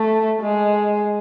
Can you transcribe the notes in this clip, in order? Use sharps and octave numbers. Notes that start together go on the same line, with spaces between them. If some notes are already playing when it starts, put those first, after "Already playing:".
Already playing: A3
G#3